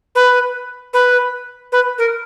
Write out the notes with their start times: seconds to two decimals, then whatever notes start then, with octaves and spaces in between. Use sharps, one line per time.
0.15 B4
0.93 B4
1.72 B4
1.98 A#4